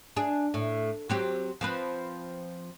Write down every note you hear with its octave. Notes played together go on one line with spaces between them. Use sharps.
D4 G#4
A2
F#3 C4 G4
F3 C4 B4